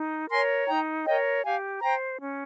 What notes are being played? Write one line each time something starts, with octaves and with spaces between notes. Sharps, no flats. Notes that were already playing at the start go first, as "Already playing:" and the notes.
Already playing: D#4
A#4 C#5 G#5 C6
D#4 G5 A#5
A#4 C#5 D#5 G5
G4 F5 G#5
C5 G5 A#5
C#4